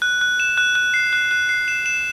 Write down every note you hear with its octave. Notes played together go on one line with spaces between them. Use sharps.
F#6
F#6
E7
F#6
F#6
C7
F#6
F#6
C7
E7
E7